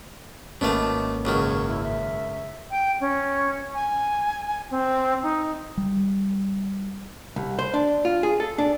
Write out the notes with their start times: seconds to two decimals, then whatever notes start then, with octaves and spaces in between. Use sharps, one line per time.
0.61 G#1 B2 D#3 A3 A#3 C#4 D6
1.25 C#2 F#2 D#3 C#5
1.66 E4
1.83 E5
2.71 G5
3.01 C#4
3.74 G#5
4.71 C4
5.23 D#4
5.77 G3
7.36 C2
7.59 C5
7.74 D4
8.05 F4
8.23 G#4
8.40 A4
8.58 D4